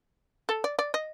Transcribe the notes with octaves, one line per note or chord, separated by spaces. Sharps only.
A4
D5
D5
D#5